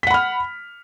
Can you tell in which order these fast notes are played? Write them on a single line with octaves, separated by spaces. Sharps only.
B6 F#5 B5 F6